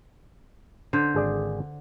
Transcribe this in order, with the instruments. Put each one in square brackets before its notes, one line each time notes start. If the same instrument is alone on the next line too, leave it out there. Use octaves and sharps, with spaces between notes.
[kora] D3 C5
[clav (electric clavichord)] G#1 G#4 D5